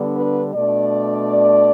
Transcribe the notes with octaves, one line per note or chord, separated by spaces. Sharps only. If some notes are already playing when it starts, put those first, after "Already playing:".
Already playing: D3 G3 B3 D4
B4
B2 A3 D4 D5